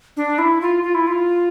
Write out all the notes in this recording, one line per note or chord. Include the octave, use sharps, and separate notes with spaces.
D4
E4
F4
F4
E4
F4